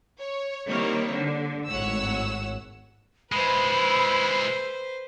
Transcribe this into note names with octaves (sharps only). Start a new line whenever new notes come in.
C#5
D#3 G3 A#3 C4 E4 C#5
D3
G#1 A2 C#5 F#5 E6
G#3 E4 B4 C5 B5